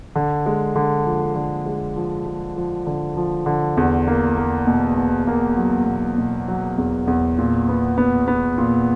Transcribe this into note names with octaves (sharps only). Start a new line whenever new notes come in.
D3
G#3
D3
F3
D3
G#3
F3
G#3
F3
D3
F3
D3
E2
A#3
A#3
B2
B2
A#3
F#3
B2
B2
F#3
E2
E2
A#2
B3
B3
B3
A#2